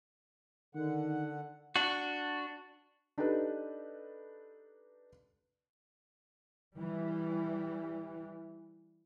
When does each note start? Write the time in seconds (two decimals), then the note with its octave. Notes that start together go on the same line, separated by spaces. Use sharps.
0.75 D3 D#3 F#5
1.76 D4 F#4
3.18 D4 D#4 G4 A4 B4
6.76 E3 G3